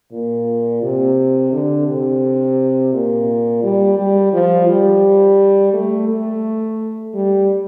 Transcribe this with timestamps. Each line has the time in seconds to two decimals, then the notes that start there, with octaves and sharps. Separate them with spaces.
0.12 A#2
0.82 C3
1.52 D3
1.88 C3
2.93 A#2
3.63 G3
3.98 G3
4.33 F3
4.68 G3
5.73 A3
6.09 A3
7.14 G3